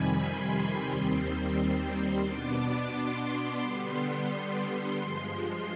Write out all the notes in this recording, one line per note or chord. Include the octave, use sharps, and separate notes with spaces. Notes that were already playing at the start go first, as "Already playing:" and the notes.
Already playing: F2 C3 D#3 G3 G#5 B5
C6
D#2 D#3 G3 C4
B2 B3 D4 D6
D6
C6
D3 G3 B3
G2 F3 G#3